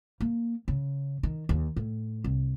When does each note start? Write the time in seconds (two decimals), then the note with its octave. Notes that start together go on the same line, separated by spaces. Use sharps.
0.21 A#3
0.68 C#3
1.23 D#3
1.49 D#2
1.76 A2
2.24 C2